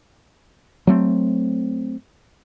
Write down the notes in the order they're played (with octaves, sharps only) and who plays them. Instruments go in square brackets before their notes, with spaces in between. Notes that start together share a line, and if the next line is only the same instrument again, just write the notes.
[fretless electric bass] F#3 A3 C4